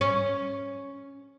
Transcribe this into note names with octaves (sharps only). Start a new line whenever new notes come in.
C#4